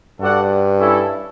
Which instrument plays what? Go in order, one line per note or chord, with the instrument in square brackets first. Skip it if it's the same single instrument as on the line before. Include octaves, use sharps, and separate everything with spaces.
[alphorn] G2 [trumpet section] F#4 A4 D5 F#5
[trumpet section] C#4 E4 A4